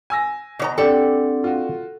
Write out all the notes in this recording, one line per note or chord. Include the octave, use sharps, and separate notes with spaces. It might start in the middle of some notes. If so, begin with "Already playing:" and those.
G#5 E6 A#6
B2 C#5 D#5 A#5
C4 D4 G4 A4 D5 F#5 G5
F4 F#4